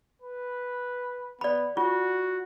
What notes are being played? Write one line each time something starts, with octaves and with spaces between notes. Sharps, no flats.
B4
B3 D5 B5
F4 F#4